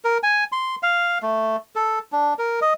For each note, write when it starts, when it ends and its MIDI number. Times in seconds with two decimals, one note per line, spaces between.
0.04 0.18 70
0.23 0.44 80
0.52 0.76 84
0.83 1.18 77
1.22 1.56 57
1.75 1.99 69
2.12 2.34 62
2.39 2.60 70
2.61 2.73 75